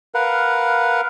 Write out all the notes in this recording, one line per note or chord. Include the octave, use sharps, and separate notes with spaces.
A#4 B4 F5 F#5